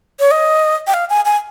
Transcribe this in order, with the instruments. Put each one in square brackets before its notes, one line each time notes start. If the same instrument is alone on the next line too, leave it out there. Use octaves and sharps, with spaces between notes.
[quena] C#5
D#5
G5
F5
G#5
G#5